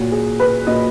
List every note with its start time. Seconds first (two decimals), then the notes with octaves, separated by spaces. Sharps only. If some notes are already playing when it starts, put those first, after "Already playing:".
Already playing: A#2 F#3 F#4
0.12 G#4
0.40 B4
0.67 A#2 F#3 D#5